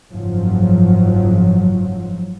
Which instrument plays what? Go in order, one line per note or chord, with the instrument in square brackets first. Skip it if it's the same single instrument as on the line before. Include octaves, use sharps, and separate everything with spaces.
[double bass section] F#1 G#2 F3 F#3